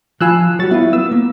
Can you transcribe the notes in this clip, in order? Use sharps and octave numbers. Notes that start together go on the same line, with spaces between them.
F3 F4 G#5 B5 E6 F#6
F#3 G3 F#4 A6
B3 E4 F4
B3 E6
A#3